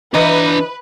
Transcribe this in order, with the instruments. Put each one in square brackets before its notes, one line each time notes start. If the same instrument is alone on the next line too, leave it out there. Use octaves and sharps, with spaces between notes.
[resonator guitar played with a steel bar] E3 D#5 [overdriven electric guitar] D4 A#5 [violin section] B4